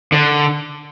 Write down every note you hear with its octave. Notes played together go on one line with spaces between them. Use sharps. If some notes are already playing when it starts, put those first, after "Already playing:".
D3